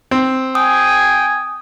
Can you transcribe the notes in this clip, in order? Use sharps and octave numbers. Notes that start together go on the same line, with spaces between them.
C4
G5 G#5 D#6